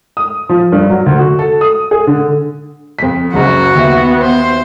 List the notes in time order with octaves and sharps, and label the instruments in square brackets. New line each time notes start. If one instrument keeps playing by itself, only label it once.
[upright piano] D#6
F3
G2
F#3
D2
F#4
A4
D#6
G#4
D3
F2 B6
[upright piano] F#1 C#2 F#2 [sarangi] F#4
[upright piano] D#2 E5 [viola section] B3
[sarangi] C5